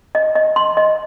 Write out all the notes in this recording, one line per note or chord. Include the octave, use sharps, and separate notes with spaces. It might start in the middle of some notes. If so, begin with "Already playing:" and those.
D#5
D#5
C6
D#5